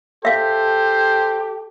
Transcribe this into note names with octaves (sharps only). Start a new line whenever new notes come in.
G4 A4 C5 E5 F5